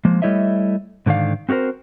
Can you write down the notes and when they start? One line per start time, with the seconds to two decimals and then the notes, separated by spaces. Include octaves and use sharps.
0.05 F3 G#3 A#3
0.22 G3 A3 E4 C#5 D#5 E5
1.06 G#2 D3 D#3 D4 F5
1.49 C4 F#4 G4 A#4 C5